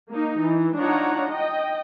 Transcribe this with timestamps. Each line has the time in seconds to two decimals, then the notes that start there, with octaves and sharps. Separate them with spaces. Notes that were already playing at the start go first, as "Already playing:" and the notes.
0.11 A#3 D#4
0.42 E3
0.78 D4 D#4 F4 C#5 F#5 A#5
1.31 D#5 G5